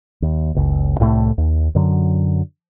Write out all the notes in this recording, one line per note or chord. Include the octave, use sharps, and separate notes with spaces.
D#2
F#1 C#2
C2 A2 F3 A3
D#2
F#2 D3 F#3